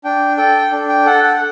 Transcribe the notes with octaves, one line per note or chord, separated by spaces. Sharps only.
D4 G5
A4 G5
D4
G5
A4 F#5
F#5